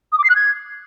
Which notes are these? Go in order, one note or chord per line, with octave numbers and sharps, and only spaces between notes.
D#6
D6
C7
F#6
G#6